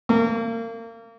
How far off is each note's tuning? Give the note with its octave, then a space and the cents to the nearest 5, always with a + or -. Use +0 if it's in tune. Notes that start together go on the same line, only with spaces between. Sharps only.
A#3 -30